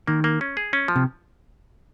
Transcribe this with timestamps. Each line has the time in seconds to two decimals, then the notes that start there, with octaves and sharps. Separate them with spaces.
0.07 D#3 A#3
0.24 A#3
0.41 C#4
0.57 G#4
0.73 C#4
0.88 F3
0.96 C3